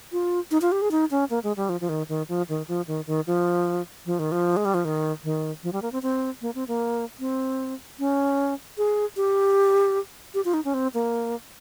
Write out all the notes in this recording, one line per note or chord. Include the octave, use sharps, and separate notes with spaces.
F4
D#4
F4
G4
G#4
D#4
C#4
A#3
G#3
G3
F3
F3
D#3
D#3
F3
D#3
F3
D#3
D#3
F3
F3
D#3
F3
G#3
G3
F3
D#3
D#3
F3
G3
A#3
C4
C4
A#3
C4
A#3
C4
C#4
G#4
G4
G4
F4
D#4
C#4
C4
A#3